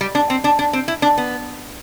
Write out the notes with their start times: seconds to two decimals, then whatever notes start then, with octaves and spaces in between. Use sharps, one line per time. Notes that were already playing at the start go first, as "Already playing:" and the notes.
0.01 G3
0.15 D4
0.30 C4
0.44 D4
0.59 D4
0.73 C4
0.88 E4
1.02 D4
1.18 B3